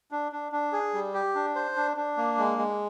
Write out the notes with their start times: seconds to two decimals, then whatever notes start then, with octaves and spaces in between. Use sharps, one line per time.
0.11 D4
0.32 D4
0.52 D4
0.73 G#4
0.94 G3
1.14 G4
1.35 D4
1.55 C5
1.76 D4
1.97 D4
2.17 A#3
2.38 G#3
2.58 G#3